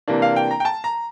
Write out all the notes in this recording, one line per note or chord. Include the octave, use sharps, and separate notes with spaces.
C3 E3 A#3 D4
F5
G5
A#5
G5
A5
A#5